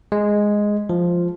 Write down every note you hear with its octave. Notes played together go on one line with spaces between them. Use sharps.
G#3
F3